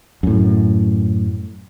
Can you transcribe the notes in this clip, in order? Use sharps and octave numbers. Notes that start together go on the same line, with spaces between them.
F#2 A2